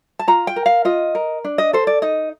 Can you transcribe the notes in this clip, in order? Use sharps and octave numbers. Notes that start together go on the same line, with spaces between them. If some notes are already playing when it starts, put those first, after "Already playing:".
A5
F4 A#5
G5
A#4
F5
F4 D#5
A#4
D4
D#5
A4 C5
D5
D#4 D#5